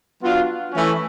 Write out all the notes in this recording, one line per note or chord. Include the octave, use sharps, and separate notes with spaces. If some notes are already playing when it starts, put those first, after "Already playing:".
F#3 B3 D4 F4
E3 A3 C#4